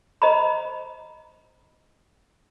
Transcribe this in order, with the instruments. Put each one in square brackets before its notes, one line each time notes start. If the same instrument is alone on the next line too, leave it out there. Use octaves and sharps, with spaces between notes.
[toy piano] C5 D#5 A#5 B5